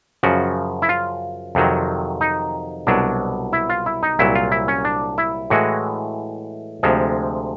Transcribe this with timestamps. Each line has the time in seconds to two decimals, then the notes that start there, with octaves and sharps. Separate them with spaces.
0.23 F#2 C#3 F3 F#4
0.82 E4
0.89 F4
1.55 F2 C3 D#3 F#3
2.21 D#4
2.87 C2 B2 F#3 D4
3.53 E4
3.69 F4
3.86 E4
4.03 D#4
4.19 C2 A#2 F#3 E4
4.35 F4
4.52 E4
4.68 C#4
4.85 D4
5.18 E4
5.50 A2 E3 G#3 F#4
6.83 D2 C3 F3 G#3